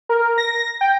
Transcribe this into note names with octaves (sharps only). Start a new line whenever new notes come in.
A#4
A#6
G5